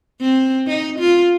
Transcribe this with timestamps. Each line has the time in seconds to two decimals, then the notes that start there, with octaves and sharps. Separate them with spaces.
0.21 C4
0.67 D#4
0.99 F4